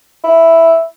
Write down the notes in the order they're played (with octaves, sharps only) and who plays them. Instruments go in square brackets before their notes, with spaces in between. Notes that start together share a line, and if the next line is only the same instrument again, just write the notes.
[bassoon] E4